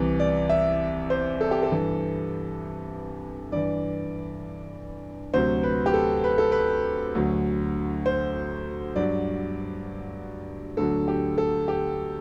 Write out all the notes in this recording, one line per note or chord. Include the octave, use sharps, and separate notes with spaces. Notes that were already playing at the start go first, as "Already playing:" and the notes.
Already playing: C2 C3 E3
D5
E5
C5
A4
G4
A4
G2 E3
G2 E3 D5
D2 C3 F#3 C5
B4
G4
A4
B4
A4
B4
D2 D3 F#3
C5
G2 F#3 D5
D2 D3 F#3 A4
G4
A4
G4